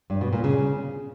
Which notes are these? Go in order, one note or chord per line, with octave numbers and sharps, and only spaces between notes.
G2
B2
A#2
C#3